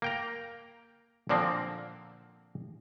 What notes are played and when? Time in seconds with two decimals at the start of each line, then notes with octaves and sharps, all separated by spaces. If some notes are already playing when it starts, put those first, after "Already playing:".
0.02 A#3 G5 A#5
1.29 A#2 D3 F3 A#3 C4